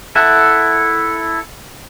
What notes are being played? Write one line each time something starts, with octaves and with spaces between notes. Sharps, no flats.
E4 A4 E5 F#5